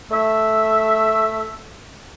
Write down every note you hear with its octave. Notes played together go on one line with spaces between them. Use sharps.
A3 E5